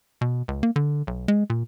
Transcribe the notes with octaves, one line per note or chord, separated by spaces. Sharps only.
B2
C#2
A#3
D3
B1
G#3
A#2